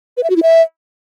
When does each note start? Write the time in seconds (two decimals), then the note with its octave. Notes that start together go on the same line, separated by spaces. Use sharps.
0.17 B4
0.23 E5
0.30 F#4
0.36 E4
0.43 E5